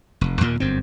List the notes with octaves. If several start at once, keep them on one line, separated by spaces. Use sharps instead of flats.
F1
D#2 A#2 A#3
G1 F#2 C4